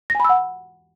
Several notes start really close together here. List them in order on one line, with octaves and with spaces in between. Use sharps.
A#6 G#5 B5 E6 F#5